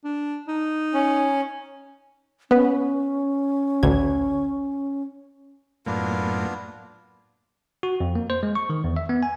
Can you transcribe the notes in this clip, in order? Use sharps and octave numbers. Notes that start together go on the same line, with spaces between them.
D4
D#4
C#4
B3 C#4 B4
A1 D2 G#6
F#2 A2 A#3 B3 D4 F4
F#4
F2
A#3
C5
G#3
C#6
D#3
E2
E5
B3
G#5